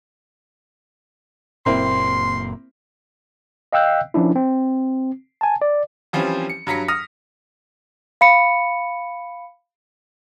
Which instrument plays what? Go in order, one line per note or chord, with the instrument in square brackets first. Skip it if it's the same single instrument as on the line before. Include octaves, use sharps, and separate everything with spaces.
[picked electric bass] F#1 A#2 [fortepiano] A#3 C4 E4 [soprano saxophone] C6
[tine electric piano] D#5 F5 G5 E6 F#6 G6
F3 C#4 D4 E4
C4
G#5 A5
D5
[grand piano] E3 F3 G3 C4 C#4
C#7
G2 F#3 A#5 B6 C#7
D#6 F6 A#6
[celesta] F5 B5 C#7